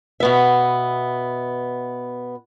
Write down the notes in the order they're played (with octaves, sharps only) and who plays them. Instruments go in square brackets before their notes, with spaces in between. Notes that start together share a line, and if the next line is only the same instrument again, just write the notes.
[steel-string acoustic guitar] B2 B3 E5